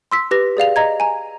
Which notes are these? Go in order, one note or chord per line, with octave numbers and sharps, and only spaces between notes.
C6 E6 B6
G4 B4 A#6
G#4 D5 F5 F7
D#5 A#5 G#6
G#5 A#5